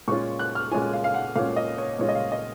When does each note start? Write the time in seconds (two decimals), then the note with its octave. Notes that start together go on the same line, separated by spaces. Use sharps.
0.08 A#2 G#3 C#4 F4 C#6
0.39 F#6
0.55 F6
0.71 A#2 G#3 C#4 F4 G#5
0.93 F5
1.04 F5
1.14 F#5
1.36 A#2 G#3 C#4 F4 F5
1.56 D#5
1.78 C#5
1.99 A#2 G#3 C#4 F4 C#5
2.09 D#5
2.15 F5
2.32 D#5